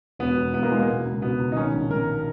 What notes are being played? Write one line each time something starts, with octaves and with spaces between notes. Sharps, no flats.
E1 B3
E1
E2 B3
A#3
E3 G#3
A#3
B2
C#2
B2 B3
C#2
D#4
D#3 C#4
A#1
D#3 A#4